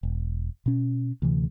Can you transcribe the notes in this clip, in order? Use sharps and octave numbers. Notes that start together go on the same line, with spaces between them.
E1
B2 C#4
D2 C3 E3